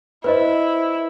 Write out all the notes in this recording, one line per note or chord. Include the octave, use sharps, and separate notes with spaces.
E4 B4 C5 D#5